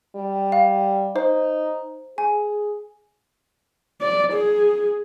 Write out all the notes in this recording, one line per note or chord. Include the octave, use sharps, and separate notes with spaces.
G3
F5
D#4 C5
G#4 G#5
D5
G#4